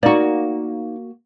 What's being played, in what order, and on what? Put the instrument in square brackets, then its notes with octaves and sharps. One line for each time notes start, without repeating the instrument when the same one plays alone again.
[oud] A#3 F#4 [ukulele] D#4 D5